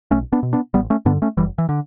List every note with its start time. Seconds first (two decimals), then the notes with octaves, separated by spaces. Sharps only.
0.11 B1 A3 C#4
0.32 B3 D4
0.43 B2
0.53 B3 D4
0.74 A1 G3 B3
0.90 A3 C#4
1.05 G2 D3 B3 D4
1.22 A3 C#4
1.37 F#1 E3 G3
1.58 E3
1.69 D3